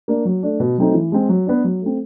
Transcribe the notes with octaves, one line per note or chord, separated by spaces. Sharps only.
A#3 D4
F#3
A3 D4
B2
F#3 A3 C4 D#4
E3
G#3 C4
F#3
B3 D4
F#3
A3 C4